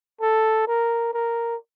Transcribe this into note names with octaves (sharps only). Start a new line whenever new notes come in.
A4
A#4
A#4